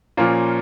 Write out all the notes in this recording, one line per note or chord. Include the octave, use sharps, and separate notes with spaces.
A#2 F3 A#3 C#4 F4